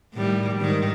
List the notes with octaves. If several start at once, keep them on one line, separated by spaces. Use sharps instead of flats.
A2 D#3 G3
G#2 D#3